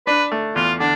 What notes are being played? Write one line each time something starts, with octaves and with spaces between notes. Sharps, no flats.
D4 B4
A3
E2 F4
D3 D4